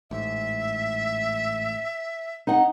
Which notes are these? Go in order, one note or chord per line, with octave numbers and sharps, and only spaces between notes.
A1 G#2 E5
D#4 F#5